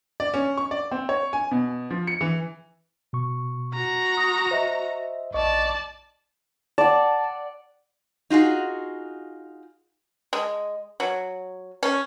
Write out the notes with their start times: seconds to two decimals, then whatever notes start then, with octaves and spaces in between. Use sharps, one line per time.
0.20 D5
0.34 C#4
0.57 C#6
0.71 D5
0.91 C4
1.09 C#5
1.33 G#5
1.51 B2
1.90 F3
2.07 C#7
2.21 E3
3.13 B2 C#6
3.74 F#4 A#5
4.17 D#6
4.51 C5 D#5 E5
5.34 A#1 D5 D#5 A5 C#6
6.78 D5 F#5 A5
8.30 D#4 F4 F#4 G#4
10.33 G#3
11.00 F#3
11.83 C#4